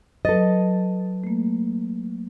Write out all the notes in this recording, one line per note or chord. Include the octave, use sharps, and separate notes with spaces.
F#3 A4 B4 D#5 A6
A3 A#3